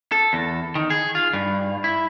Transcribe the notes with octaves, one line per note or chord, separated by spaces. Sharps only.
A4
E2
D#3
G#4
F4
G2
E4